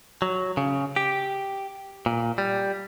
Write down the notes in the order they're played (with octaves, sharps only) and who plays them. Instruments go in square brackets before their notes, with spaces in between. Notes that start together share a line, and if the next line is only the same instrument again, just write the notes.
[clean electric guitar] F#3
C#3
G4
A#2
G3